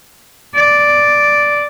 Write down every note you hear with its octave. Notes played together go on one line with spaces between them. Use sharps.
D5